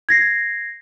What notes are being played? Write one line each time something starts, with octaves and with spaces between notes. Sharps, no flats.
G#6 A#6 C7